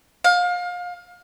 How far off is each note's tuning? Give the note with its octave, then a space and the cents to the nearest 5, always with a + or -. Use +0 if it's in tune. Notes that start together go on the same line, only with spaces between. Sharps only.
F5 +30